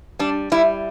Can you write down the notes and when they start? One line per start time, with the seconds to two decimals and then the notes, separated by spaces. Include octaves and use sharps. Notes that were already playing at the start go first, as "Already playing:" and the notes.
0.19 G3 D4
0.52 G3 E4